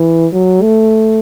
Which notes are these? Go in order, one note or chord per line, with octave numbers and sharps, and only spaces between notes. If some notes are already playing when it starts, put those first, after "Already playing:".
Already playing: E3
F#3
A3